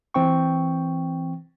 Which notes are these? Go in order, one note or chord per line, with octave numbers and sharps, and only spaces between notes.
E3 C4 G5 C#6